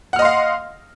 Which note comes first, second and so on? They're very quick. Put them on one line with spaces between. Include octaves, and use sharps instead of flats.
F#5 F6 D#5 C6 F5